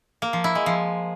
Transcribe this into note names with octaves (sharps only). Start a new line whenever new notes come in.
A#3
F3
E4
G#3
F3